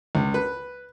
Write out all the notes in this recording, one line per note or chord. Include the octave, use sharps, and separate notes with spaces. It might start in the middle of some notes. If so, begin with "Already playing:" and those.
C#2
B4